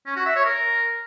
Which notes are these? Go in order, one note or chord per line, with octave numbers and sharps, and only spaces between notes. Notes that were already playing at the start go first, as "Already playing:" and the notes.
C#4
F#4
E5
C#5
A#4